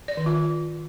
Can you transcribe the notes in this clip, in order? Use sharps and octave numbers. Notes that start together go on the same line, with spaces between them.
D5
D#3
F4